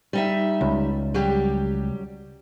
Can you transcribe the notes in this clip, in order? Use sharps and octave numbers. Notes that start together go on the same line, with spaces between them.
G3 D#4 E5
C#2
F#3 G3 G4